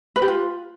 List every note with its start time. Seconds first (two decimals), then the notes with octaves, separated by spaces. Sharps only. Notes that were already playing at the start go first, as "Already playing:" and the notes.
0.16 B4
0.22 G4
0.28 F4